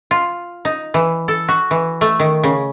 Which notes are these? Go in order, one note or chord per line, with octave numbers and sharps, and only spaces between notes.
F4
D#4
E3
A4
F#4
E3
A3
D#3
C#3